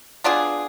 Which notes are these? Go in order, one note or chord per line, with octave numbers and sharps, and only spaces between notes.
B3 D4 F4 G#4